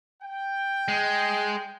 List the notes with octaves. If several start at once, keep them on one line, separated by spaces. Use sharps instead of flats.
G5
G#3